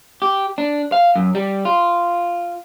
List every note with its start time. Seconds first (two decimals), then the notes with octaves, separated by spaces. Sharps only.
0.22 G4
0.58 D4
0.92 F5
1.15 F#2
1.35 G3
1.65 F4